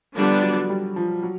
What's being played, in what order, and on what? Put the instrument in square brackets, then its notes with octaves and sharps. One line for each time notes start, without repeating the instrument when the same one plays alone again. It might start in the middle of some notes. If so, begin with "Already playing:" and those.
[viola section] D3 G3 B3 D4 [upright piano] F3
[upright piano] F#3
G3
F3
F#3